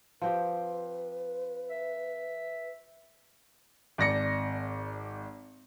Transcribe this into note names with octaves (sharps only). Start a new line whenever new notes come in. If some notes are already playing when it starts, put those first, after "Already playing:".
F3 C4 G4 B4
E5
G#1 D5 A#6 C#7